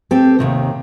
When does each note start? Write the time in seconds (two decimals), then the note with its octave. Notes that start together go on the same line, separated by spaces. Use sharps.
0.11 C4 G4 A4
0.39 D#2 C3 D#3